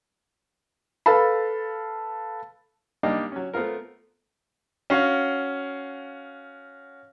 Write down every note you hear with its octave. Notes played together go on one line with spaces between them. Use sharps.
A4 B4 F5 A5 B5
G3 A#3 D4 D#4 G4 D#5
F#3 C#4
A3 B3 C4 F4 A#4
C#4 F#4 F5 C#6